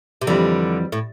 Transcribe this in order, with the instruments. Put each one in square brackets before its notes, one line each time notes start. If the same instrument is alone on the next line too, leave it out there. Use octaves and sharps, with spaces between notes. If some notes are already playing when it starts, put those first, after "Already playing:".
[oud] C3
[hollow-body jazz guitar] F2 E3 G3 C4 [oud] D3
[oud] A2